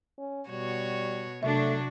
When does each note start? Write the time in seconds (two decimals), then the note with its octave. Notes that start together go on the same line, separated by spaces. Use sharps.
0.18 C#4
0.49 B2 G3 F#4 C#5
1.43 C3 F#3 A3 D4 F#4 E5